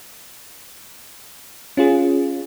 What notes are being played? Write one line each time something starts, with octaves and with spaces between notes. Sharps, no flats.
C#4 F4 G#4